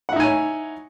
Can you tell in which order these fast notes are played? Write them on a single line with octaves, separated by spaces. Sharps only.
F#5 E4 D#4 G#5 C#5